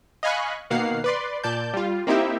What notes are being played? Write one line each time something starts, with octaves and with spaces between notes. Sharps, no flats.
D#5 F5 G#5 B5 C#6 F#6
B2 D#3 A#3 F5 F#5 C7
B4 D5 C6
A#2 D5 A5 G6
G3 F4
A#3 C4 D#4 E4 G4 E5